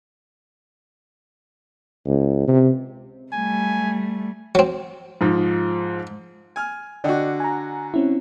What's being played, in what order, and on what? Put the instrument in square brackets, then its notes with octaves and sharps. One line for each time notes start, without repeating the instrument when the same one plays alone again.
[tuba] C#2
C3
[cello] G3 A3 [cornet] G#5
[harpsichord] F#3 C4
[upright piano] G#2 F3
[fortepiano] G#5 F6
[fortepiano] D3 F#4 [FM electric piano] D5 D#5 G5
[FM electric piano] G#5 A#5
C4 C#4 E4